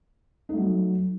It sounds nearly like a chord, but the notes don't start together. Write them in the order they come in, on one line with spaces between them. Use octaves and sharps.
D#4 A3 F#3